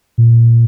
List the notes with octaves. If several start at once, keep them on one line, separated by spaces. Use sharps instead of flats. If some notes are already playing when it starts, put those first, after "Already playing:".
A#2